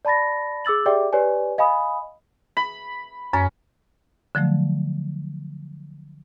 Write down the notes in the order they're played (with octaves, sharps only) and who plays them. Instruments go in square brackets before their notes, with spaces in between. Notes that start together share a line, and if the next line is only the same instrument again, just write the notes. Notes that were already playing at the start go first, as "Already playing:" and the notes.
[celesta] D5 A5 B5 A6 A#6
G#4 D6 E6 A6 F#7
G4 G#4 D5 E5 G5 D6
G4 B4 C#5 D5 G#5
D#5 F5 G#5 B5 D#6
[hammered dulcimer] B5
[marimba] F#2 [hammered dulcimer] C#4
[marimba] D3 F3 F#3 A3